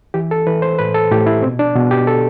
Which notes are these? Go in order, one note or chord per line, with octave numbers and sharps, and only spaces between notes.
E3 G4
A4
E3 B4
C5
A2 B4
A4
A2 G4
E4
B2 C4
D4
B2
G4
A4